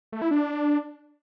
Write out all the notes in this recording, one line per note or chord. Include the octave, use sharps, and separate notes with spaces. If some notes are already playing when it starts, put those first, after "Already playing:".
A3
E4
D4